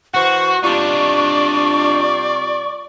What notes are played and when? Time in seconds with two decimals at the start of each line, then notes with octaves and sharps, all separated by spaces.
0.14 E3 F#4 C5 F#5 C#6
0.63 C3 G3 D4 D#4 F4 D5 C#6